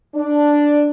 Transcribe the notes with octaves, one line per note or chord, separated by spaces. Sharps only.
D4